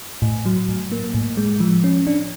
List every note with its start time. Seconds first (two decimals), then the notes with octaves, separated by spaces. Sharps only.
0.22 A2
0.45 F#3
0.69 A2
0.92 A#3
1.14 A2
1.37 G#3
1.60 F3
1.84 C#4
2.07 D4